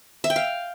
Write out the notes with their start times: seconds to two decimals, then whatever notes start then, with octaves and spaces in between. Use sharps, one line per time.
0.24 E5
0.30 G5
0.36 F5